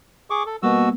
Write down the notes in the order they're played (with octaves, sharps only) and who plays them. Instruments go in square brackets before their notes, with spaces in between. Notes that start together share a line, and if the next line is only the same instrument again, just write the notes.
[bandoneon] G#4 C#6 D6
A4
[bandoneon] B2 F#4 E6 [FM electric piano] G3 A#3 B3